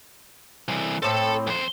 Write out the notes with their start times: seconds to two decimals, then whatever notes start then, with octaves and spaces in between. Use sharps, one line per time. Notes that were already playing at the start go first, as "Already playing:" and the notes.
0.68 C2 E3
1.03 A2 C4 A4 A5
1.47 F2 C5